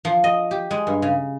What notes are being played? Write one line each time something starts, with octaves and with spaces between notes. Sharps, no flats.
F3
D#5
G4
G#3
G2
C#3